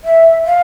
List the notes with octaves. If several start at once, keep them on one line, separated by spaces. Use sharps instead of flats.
E5
F5